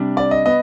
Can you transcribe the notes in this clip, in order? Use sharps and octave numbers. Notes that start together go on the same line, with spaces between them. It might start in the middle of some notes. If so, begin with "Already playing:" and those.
Already playing: C3 G3 D4
D5
D#5
B3 D#5